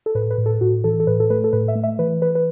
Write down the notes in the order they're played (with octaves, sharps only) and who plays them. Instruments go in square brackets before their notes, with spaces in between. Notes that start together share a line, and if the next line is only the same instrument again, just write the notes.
[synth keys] A4
A2 B4
B4
A2
A4
A2 F#4
E3 A4
A4
A2 B4
A4
A3 B4
A4
A2 B4
E5
A3
E5
E3 B4
E3 B4
B4